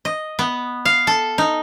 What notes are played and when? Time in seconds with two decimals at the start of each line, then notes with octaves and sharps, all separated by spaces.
0.05 D#5
0.39 B3
0.85 F5
1.07 A4
1.38 D#4